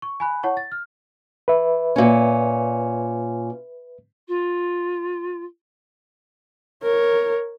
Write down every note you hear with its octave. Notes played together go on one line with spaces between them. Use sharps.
C#6
G#5 B5 F#6
E4 C#5 F#5 A5 C#6
A6
F6
B4 E5
A#2 C#4
F4
A#4 C#5